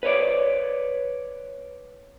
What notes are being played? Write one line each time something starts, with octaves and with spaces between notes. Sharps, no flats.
B4 C#5 D5